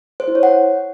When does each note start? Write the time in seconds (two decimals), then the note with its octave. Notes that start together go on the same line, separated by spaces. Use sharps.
0.20 C5
0.28 E4
0.35 C#5
0.43 F#5